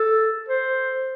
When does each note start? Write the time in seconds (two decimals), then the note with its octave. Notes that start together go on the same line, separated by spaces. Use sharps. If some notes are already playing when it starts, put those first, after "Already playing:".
Already playing: A4
0.49 C5